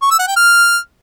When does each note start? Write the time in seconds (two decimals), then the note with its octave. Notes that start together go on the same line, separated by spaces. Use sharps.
0.02 C#6
0.10 E6
0.19 F#5
0.28 G5
0.36 F6